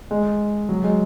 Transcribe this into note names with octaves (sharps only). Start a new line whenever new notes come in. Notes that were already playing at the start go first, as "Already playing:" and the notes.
G#3
F#3
G#3